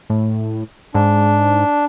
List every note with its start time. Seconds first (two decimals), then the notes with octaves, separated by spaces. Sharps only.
0.10 A2
0.95 G#2 D4